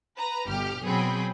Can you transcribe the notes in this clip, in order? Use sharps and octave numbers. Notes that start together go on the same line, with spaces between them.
B4 A#5
G1 B2 G4 F6
B2 F#3 C4 G#4 G5 B5